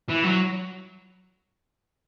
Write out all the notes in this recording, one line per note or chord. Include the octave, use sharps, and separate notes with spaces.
E3
F#3